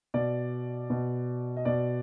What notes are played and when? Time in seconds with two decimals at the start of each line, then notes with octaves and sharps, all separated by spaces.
0.14 B2 D5
0.90 B2
1.57 D#5
1.65 B2 D5